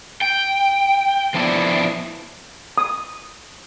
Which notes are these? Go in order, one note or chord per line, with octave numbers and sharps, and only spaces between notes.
G5
F3 B3 D4 E4 D5
D#6